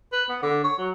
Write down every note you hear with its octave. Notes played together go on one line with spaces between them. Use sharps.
B4
B3
D3
C#5
F#3